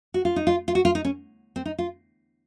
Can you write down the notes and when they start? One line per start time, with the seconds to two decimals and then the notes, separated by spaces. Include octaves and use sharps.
0.14 F#4
0.25 F4
0.36 D#4
0.47 F4
0.68 F4
0.75 F#4
0.85 F4
0.95 D#4
1.05 C#4
1.56 C4
1.66 D#4
1.78 F4